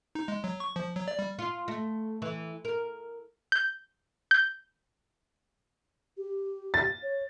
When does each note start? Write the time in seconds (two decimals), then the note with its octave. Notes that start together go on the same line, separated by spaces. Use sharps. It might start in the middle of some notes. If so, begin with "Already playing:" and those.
0.15 D#4
0.28 G#3
0.44 F#3
0.60 C#6
0.76 F3
0.96 F#3
1.08 D5
1.19 G3
1.39 F4
1.68 A3
2.22 E3
2.65 A#4
3.52 G6
4.31 G6
6.17 G4
6.74 A6
7.03 C#5